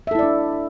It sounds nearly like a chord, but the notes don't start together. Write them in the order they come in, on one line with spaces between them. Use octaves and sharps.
E5 A4 E4 D5 D4